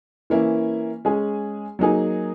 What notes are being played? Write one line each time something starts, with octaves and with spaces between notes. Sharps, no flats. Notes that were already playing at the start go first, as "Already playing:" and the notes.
E3 A#3 C#4 E4
G#3 C#4 G#4
F#3 A#3 D#4 G#4